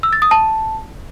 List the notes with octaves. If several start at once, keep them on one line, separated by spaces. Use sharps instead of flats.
E6
A6
D#6
A5